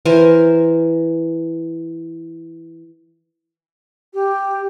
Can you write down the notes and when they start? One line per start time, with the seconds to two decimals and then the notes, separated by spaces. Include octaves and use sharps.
0.05 E3 A#4 C5 G#5
4.14 G4